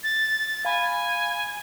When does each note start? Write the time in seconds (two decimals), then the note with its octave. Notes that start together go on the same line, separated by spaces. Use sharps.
0.04 A6
0.65 F5 G#5 B5